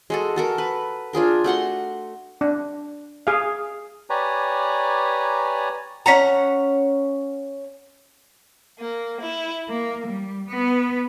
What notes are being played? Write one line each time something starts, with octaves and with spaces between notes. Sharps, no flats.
G#3 F#4 A4
F#4 A4 A#4
B4
D4 F4 G#4 A#4
A3 F#4 F#5 C6
D4
G#4 F5
G4 B4 C#5 D5 G#5 A#5
C#4 F#5 A#5
A#3
E4
A#3
G3
B3